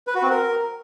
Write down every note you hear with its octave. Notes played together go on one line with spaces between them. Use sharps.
B4
F#4
C4
A#4